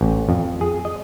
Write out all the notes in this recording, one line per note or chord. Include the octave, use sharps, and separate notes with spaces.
A1
F2
G#4
D#5